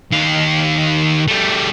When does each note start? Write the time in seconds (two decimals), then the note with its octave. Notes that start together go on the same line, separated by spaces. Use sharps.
0.12 D#2 F5
1.28 G3 A3